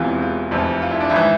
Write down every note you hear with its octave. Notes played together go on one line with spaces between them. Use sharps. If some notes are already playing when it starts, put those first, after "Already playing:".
Already playing: E1 E2 C3 E3 F4
F4
F1 F2 E3
F4
E4
D4
G#1 E4
E3